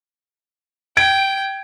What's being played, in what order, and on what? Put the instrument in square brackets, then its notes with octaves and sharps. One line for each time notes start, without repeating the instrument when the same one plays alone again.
[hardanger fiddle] G5 [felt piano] G#6 D7